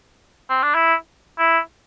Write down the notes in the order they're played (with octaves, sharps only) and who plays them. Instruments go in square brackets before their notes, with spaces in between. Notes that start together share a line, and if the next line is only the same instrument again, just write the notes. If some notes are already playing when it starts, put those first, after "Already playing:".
[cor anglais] C4
D4
E4
E4